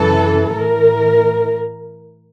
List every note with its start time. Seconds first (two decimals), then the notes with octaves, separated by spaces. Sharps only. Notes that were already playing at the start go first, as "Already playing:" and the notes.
Already playing: F#2 C#3 E3 A4
0.52 A2 E3 A#4